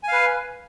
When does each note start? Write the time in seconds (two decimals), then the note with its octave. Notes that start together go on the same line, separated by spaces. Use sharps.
0.03 G#5
0.08 F5
0.13 B4